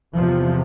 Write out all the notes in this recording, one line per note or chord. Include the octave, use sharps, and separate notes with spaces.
E2 C3 F3